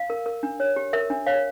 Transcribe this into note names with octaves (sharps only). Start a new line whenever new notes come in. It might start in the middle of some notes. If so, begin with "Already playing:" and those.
Already playing: F5
A#4
A#4
D4
C#5
G4
A#4 E5
D4
C#5 F5